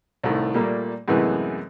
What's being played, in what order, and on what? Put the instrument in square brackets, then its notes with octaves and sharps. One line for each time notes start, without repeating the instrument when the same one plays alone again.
[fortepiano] C2 A2 D#3
A#2 G3 A3 A#3
F#2 A2 C3 E3 G#3 B3